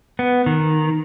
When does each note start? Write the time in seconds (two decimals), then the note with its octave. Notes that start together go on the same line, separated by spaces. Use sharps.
0.19 B3
0.46 D#3